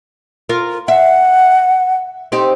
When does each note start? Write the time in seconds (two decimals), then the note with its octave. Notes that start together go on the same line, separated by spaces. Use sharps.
0.49 F4 A#4
0.88 E5 F#5
2.32 C4 D#4 G4